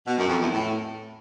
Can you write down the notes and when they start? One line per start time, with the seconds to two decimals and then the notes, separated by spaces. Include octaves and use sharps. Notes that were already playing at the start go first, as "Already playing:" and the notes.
0.06 B2
0.17 F#2
0.28 F2
0.39 E2
0.50 A2